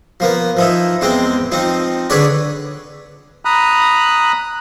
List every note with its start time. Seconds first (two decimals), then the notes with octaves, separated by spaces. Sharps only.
0.20 F3 A#3 B3
0.57 F3 D#4 E4
1.01 E2 G#3 C4 G5
1.52 F3 C4 D#4
2.10 D3 G#4 B4 C#5 D5
3.45 A#5 B5 D#6 F#6